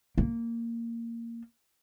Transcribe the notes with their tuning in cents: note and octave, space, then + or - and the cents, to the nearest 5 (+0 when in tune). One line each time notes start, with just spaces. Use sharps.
A#3 -10